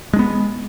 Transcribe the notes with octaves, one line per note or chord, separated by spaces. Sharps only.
G#3 B3 D4